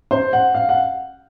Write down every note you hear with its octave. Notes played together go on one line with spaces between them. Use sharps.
C5
F#5
F5
F#5